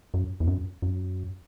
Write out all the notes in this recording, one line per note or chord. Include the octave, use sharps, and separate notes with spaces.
F#2
E2
F#2
F#2